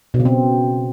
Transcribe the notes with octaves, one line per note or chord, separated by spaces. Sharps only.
B2
C#3
C4